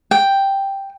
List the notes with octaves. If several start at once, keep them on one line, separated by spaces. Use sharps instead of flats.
G5